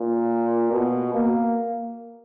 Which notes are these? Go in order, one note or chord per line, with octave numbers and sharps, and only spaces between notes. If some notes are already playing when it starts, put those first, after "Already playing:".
Already playing: A#2
B2
A#3